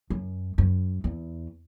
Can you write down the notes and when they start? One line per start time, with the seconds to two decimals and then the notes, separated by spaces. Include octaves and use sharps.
0.10 F#2
0.58 F#2
1.04 E2